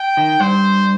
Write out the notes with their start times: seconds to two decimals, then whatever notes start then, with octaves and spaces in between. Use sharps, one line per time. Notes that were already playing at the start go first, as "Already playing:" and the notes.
Already playing: G5
0.17 D#3
0.40 G2 C5